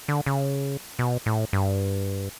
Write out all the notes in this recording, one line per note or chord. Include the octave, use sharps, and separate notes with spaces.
D3
C#3
B2
A2
G2